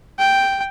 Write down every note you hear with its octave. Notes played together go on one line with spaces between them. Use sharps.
G5